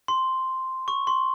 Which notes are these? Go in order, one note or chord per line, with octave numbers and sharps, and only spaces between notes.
C6
C#6
C6